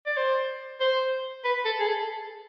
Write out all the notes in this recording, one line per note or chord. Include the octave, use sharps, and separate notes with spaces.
D5
C5
C5
B4
A4
G#4
A4